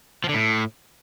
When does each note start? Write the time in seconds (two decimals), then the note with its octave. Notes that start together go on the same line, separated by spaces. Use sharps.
0.24 F3
0.29 D3
0.34 A2